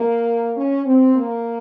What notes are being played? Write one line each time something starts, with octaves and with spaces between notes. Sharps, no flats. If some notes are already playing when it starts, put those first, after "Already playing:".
Already playing: A#3
C#4
C4
A#3